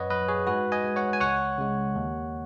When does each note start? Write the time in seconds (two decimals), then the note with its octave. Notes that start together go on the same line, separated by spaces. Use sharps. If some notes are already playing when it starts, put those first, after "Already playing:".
Already playing: F#2 B4 C#5 D#5 F#5
0.10 F#3 B4 D#5
0.28 G#4 C#5
0.47 G#2 F#4 B4
0.72 D#5 G#5
0.84 G#3
0.96 C#5 F#5
1.13 G#5
1.20 C#2 C#5 F#5
1.58 C#3 G#3
1.95 D#2